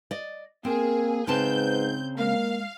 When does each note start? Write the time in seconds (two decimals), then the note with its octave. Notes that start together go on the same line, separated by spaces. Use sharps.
0.11 D5 D#5
0.65 A#3 C4 G#4 A#4
1.27 G#2 C#3 C4 B4 A5 G6
2.18 G#3 A#3 F5